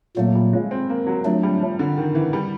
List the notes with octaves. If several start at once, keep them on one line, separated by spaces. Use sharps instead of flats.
A#2 F#3 A3 A#3
G3
G#3
C4
A#3
F#3
F3 F#3 A3 D4
G3
F3
D3
D#3
E3
G3